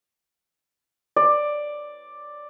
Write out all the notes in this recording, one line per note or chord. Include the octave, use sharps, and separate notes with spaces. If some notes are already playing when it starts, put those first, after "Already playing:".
D5